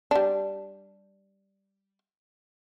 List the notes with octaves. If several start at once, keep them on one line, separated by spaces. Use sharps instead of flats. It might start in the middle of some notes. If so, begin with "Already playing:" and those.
G3 D4